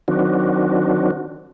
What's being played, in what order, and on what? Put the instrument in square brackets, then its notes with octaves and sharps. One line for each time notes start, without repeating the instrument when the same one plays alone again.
[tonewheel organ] D#3 F#3 C4 D4 F#4